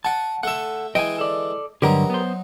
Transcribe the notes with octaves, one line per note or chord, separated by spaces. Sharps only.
F#4 F#5 A5
A3 A4 E5 F#5
E3 G#3 D#5 G5 G#5
A4 D5
G2 D3 F#3 D#4 G4 A#4 B4
B3 C5